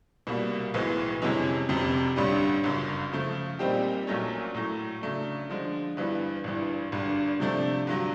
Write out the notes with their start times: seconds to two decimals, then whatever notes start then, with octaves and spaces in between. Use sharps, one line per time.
0.27 C2 B2 G3 A#3
0.74 B1 A2 E3 G#3 B3
1.22 F2 C3 E3 G#3 C#4
1.69 F1 F2 C3
2.16 A1 G2 D3 G3
2.64 G1 F#2 C#3
3.12 C#3 F3 A3
3.59 A#2 G3 C4 D#4 G4
4.07 A#1 A#2 F#3 A3 C#4
4.54 A2 F#3 A3
5.02 C#3 F#3 A3 D4
5.50 D3 F3 G#3
5.97 G2 E3 G3 B3
6.44 G#1 G2 E3
6.92 G#1 G2 D3
7.40 C3 F3 A3 D4
7.87 G2 D3 F#3